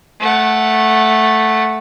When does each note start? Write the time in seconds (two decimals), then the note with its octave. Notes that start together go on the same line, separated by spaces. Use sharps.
0.20 A3 F#5